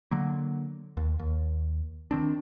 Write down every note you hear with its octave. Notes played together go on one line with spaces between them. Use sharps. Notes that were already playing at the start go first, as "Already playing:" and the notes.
D3 F#3 A#3
D#2
D#2
D#3 C4 D4